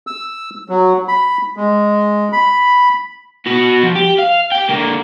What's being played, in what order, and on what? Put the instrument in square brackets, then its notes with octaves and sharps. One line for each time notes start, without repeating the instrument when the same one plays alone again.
[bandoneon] E6
F#3
B5
G#3
B5
[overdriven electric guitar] B3 F#4
F3
G4
F5
G4 G5
D3 A#3